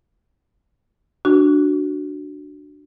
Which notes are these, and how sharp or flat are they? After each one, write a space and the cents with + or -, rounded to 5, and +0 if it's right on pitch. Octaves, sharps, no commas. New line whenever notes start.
D4 +5 F#4 +0 C#6 +45